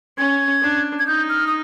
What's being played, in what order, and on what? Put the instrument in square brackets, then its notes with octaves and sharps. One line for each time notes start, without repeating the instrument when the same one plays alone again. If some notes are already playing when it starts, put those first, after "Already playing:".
[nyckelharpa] C#4 [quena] G#6
[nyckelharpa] D4
[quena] G#6
[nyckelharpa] D#4 [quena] G6
[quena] F6
D#6